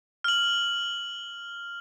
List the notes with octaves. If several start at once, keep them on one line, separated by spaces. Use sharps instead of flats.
F6 F#7